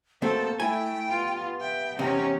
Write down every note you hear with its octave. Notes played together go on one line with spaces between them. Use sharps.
B2 A3 A#3 C4 A4 C5
A3 E4 G5 G#5
G2 B3 F4
E5 G5
E2 C3 C#4 D#4 G5